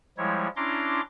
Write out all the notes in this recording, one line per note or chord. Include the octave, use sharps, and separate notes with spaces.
F3 G3 G#3 E4 C#5
C#4 D4 E4 A#5 C6 D6